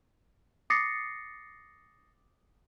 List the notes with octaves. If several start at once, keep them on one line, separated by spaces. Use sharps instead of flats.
D6 D#6 A6 A#6 C7 C#7